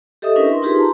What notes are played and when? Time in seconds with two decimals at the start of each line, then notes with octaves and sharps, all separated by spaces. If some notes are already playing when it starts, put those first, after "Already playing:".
0.22 G4 A4 D#5 E5 D#6
0.36 C#4 D4 E4 A#4 B4 E5
0.50 A#4 C6
0.62 D#4 F4 G4 G#4 B4 C6
0.79 A5 A#5 C6